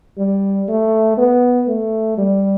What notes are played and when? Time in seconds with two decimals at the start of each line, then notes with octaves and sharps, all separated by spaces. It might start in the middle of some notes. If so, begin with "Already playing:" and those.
0.18 G3
0.69 A3
1.17 B3
1.68 A3
2.18 G3